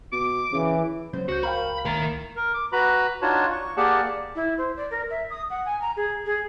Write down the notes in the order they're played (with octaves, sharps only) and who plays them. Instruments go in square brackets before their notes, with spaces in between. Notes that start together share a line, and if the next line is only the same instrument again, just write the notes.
[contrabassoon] B2 [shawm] D6
[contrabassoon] C#3 [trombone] E3
[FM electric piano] C#3 [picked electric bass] F#3 A#3 B3 [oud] C5
[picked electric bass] C#2 [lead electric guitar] F#4 [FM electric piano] C#6 G6
[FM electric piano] A#4 F5 G5 [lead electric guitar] B5
[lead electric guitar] D#3 A#5 [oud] A#3 E4 [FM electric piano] A#4 A6
[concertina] A#4
D6
F#4 B4 A#5 B5
D4 D#4 F4 F#4 C#5 A5
C#6
A#3 G4 G#4 D5 F#5 A5
[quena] E4
C5
D5
A#4
E5
D#6
F#5
G#5
A#5
G#4
G#4